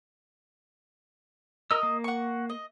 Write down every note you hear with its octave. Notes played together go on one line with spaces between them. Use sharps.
A#4 D#5 E6
A#3
F#5 C#6
D#5